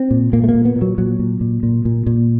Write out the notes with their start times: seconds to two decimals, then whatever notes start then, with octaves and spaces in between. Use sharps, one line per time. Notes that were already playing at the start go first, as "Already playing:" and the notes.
Already playing: C4
0.11 A#2
0.33 A#2 A#3
0.44 A3
0.49 A#3
0.55 A#2
0.65 B3
0.76 A#2
0.82 F#3
0.98 A#2 F#3
1.19 A#2
1.41 A#2
1.63 A#2
1.85 A#2
2.07 A#2